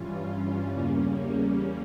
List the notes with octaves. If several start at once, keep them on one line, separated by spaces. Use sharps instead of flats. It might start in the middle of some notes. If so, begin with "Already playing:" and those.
Already playing: G2 E3 G3 C#4 F4
E2 C#3 G3 A#3 C#4